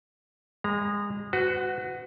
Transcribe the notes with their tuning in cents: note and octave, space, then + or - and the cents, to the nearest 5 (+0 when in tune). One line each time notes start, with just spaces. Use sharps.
G#3 -25 A#5 +10
F#4 +0 B4 +35